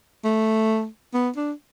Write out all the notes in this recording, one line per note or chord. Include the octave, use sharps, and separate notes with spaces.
A3
B3
D4